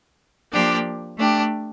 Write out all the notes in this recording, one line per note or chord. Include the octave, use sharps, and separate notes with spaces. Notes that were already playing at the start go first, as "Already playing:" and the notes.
F3 A#3 D4 G4 D5
A3 D4 G4